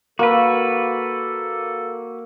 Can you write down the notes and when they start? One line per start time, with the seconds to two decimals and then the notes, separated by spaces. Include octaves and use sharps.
0.19 A#3 F#4 A4 B4